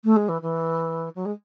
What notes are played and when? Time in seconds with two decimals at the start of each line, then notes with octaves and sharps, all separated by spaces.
0.04 A3
0.16 G#3
0.28 E3
0.42 E3
1.15 F#3
1.25 G#3